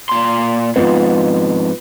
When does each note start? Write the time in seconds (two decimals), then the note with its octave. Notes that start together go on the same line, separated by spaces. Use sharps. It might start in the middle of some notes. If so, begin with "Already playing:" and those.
0.09 A#2 C6
0.76 F2 G#2 B3 F4